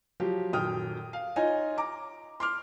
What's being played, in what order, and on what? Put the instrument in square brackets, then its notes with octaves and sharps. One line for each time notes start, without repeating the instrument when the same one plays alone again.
[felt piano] F3 F#3 G4
D#1 F#2 G5 D#6 F6
F5
D#4 F4 C#5 D#5 G#5
A#5 D6
C6 D6 F6